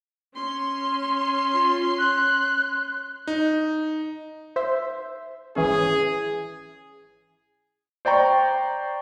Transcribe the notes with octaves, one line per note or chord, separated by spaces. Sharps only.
C#4 C6
F4
F#6
D#4
C5 E5
G#1 E3 C#4 G#4
C5 D5 G5 A#5 C#6